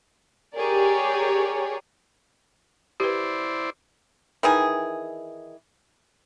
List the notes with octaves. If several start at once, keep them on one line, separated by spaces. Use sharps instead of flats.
G4 G#4 A#4 C#5 D5
E4 G4 B4 C5 D5
D#3 E3 G#4